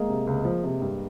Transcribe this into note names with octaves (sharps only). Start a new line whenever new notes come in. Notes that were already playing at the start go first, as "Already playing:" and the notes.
Already playing: G#3 A#3
C3
C#2
F3
C3
G2